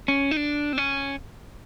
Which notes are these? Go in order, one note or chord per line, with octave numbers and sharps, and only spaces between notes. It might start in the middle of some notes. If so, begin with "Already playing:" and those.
C#4
D#4
D4
C4
C#4